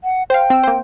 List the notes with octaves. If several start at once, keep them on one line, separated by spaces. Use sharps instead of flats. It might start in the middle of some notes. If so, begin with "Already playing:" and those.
F#5
C5 F5 G5
C4 E6
A#3 C5